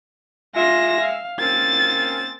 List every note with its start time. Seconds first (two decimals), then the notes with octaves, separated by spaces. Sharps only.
0.55 G#3 F4 E5 A#6
1.01 F5
1.40 A#3 C4 C#4 A6